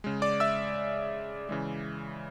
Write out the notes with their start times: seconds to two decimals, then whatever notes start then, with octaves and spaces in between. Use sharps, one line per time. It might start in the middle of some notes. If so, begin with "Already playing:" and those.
0.04 C#3 G#3
0.22 D5 D6
0.40 E5 E6
1.49 C#3 E3 G#3